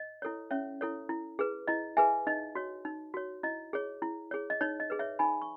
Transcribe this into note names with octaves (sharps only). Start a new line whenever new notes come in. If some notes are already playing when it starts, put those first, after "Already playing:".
Already playing: D#5
E4 A4 C#5
C#4 C#5 E5
E4 A4 C#5
E4
G#4 B4
E4 D#5
G#4 B4 E5 G#5
D#4 D#5
F#4 C#5
D#4
F#4 C#5
E4 D#5
G#4 C#5
E4
G#4 C#5
D#5
D#4 C#5
D#5
G#4 B4
C#5 E5
D#4 G#5 B5
C#6